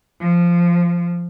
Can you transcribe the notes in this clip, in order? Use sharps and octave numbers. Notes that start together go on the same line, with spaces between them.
F3